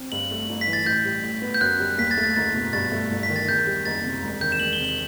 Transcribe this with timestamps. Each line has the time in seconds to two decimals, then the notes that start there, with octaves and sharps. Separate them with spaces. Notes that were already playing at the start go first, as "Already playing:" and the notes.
Already playing: C4
0.12 G2 F#7
0.31 A3
0.49 G1
0.61 B6
0.68 E3
0.73 A6
0.86 A1 G6
1.05 G3
1.23 A2
1.42 B3
1.54 G6
1.61 F#2 F#6
1.80 G3
1.98 D#2 B6
2.11 A6
2.17 A3
2.23 A6
2.36 F#1 A6
2.55 B2
2.73 G2 A6
2.92 A3
3.11 G1
3.23 B6
3.30 D#3
3.36 A6
3.49 E2 G6
3.67 G3
3.85 F#1 A6
4.04 C3
4.22 E1
4.41 D#3 G6
4.52 E7
4.60 E1 F#7
4.73 G7
4.79 C3
4.84 F#7